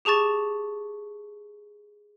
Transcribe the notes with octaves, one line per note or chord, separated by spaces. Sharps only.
G4 G#4 A5 C#6 A6